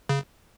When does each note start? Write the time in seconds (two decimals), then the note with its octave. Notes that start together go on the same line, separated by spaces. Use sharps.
0.09 C#3